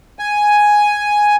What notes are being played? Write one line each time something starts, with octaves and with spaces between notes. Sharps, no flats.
G#5